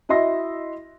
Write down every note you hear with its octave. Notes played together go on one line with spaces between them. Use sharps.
E4 F#4 D#5 E5 C6 A#6